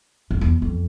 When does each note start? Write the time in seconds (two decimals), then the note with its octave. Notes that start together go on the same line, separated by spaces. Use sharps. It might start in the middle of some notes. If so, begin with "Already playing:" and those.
0.31 F2
0.41 E2
0.62 F2